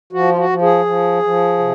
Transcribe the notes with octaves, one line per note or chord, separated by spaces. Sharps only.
F3 F#4
F4
F#4
F3
G#4
F3
F3
C3